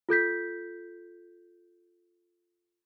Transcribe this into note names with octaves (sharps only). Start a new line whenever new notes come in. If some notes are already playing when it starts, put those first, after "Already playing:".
F4 A4 G6 B6